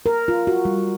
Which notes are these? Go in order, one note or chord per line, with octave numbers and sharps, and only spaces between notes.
A#4
F4
F#4
G3